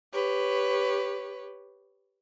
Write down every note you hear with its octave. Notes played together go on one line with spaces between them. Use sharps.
G4 B4 C#5